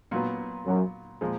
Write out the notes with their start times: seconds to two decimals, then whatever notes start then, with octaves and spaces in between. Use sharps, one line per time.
0.11 A#2 F#3 B3
0.66 F#2
1.21 A#2 F3 G#3